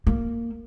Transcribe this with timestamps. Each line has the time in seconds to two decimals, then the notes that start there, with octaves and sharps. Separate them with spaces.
0.07 A#3